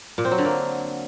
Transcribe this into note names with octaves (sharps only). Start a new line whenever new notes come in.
A#2
C4
F#3
D3
A#3